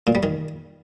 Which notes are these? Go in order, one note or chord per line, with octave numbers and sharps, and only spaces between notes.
A#2
G3
D#3